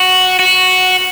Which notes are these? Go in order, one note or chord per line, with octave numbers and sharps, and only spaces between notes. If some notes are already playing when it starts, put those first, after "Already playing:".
Already playing: F#4
F#4